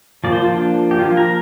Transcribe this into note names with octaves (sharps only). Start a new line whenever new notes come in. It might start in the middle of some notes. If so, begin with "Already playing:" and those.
F3 A#3 D5
C5
F4
D4
G4
F3 A#3 F4
A#4